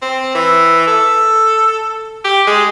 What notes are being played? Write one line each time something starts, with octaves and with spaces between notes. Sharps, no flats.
C4
E3
A4
G4
G#3